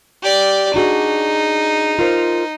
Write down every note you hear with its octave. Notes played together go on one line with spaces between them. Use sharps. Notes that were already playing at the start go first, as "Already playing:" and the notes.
G4 D5
D4 D#4 F#4 G#4
F4 A#4 C5